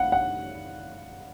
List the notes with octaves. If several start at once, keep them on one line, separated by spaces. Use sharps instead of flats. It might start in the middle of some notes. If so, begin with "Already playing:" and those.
Already playing: F5 F#5
F#5